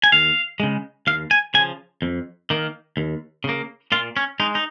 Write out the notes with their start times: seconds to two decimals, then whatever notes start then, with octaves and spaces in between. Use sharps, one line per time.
0.04 G#5
0.12 D#2 F5
0.60 C#3 G#3
1.07 D#2 F5
1.31 G#5
1.54 C#3 G#5
1.59 F3
2.02 F2
2.50 D#3 A#3
2.97 D#2
3.44 C#3 A#3
3.92 A#2 F4
4.17 C#4
4.40 G#3 D#4
4.55 D#4